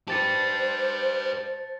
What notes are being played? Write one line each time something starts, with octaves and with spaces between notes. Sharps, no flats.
G4 B4 C5 A5 A6 C#7